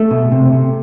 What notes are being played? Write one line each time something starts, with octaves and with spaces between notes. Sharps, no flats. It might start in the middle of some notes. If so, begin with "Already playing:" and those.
Already playing: A3
B2
C3
C3